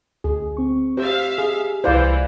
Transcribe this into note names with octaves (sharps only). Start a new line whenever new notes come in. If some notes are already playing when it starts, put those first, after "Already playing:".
D2 G#4
C4 C#6
G4 C5 E5 F5
G#4
C2 E3 E4 C5 D5 F5